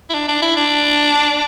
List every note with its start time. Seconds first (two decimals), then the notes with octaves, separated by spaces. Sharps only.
0.09 E4
0.14 D4
0.28 D4
0.42 E4
0.57 D4